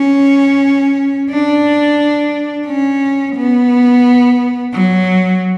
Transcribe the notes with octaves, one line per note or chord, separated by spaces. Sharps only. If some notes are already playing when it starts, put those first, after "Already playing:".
Already playing: C#4
D4
C#4
B3
F#3